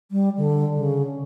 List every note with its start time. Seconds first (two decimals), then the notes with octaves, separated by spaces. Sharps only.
0.11 G3
0.37 D3
0.75 C#3